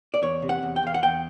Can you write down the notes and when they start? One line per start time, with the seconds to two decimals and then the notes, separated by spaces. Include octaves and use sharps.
0.14 D5
0.22 E2 C#5
0.42 C3
0.49 F#5
0.63 E2
0.76 G5
0.83 E2 F5
0.94 F#5
1.03 E2 G5